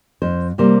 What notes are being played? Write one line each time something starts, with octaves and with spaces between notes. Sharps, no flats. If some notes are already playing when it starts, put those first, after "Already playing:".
F2 C5
C3 G3 A#3 C5